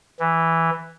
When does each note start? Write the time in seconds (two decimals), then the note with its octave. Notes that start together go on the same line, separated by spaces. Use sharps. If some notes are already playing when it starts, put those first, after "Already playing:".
0.20 E3